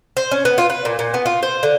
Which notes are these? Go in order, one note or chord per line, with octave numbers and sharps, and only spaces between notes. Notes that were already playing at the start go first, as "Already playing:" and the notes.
C5
C#4
B3
F4
B4
A#2
A#2
B3
F4
C5
D3